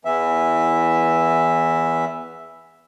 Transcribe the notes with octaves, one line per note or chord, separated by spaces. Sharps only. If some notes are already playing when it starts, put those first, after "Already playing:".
E2 E3 E5